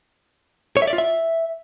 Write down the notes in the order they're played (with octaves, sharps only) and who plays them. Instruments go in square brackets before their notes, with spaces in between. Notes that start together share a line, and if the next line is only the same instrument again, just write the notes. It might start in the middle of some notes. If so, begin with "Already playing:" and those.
[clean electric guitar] C#5
E5
D5
F4
E5